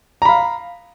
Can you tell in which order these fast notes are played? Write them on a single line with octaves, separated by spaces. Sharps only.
A#5 B5 F5